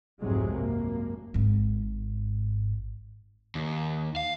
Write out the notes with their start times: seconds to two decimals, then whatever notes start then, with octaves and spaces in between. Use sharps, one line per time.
0.20 F1 C2 G#2 C3 F#3 G#3
0.53 G#1 F#2 A#3
1.34 G#1 G#2
3.55 D#2
4.16 F5